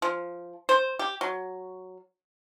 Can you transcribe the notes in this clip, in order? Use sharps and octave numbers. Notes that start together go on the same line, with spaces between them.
F3
C5
G4
F#3